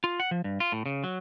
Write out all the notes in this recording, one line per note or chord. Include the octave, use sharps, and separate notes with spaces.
F4
F#5
F3
G2
F4
A2
C#3
F#3